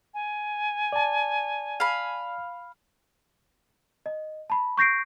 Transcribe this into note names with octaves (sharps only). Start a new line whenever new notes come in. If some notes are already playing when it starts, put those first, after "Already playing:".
G#5
D5 A5
F5 B5
D#5
A5 B5
C#6 G6 A#6 C7 D7